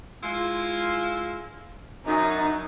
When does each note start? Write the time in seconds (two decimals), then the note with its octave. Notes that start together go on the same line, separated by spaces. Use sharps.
0.22 G#3 E4 F4
2.06 F#2 D#4